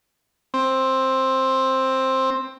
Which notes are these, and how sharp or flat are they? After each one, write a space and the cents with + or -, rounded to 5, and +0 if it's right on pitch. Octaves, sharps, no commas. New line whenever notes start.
C4 +10